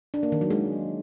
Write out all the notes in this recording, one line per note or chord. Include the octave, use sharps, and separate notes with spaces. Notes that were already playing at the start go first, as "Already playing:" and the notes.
D4
A#3
D#3
F#3
G#3